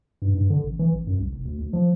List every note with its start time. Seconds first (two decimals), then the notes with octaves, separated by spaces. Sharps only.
0.22 G2
0.34 G2
0.50 D3
0.64 A1
0.79 E3
0.92 A1
1.07 F#2
1.19 C2
1.33 F1
1.45 D2
1.59 D2
1.73 F3